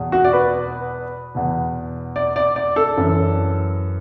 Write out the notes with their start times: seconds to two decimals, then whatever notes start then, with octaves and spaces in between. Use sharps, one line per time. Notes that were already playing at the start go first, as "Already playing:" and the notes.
Already playing: E2 B2
0.12 F#4
0.25 D5
0.33 B4
1.35 E2 B2
2.16 D5
2.36 D5
2.56 D5
2.76 A4
2.97 F#2 E3